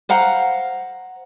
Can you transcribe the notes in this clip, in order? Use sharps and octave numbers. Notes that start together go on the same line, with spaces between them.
C5 F5 F#5 A#5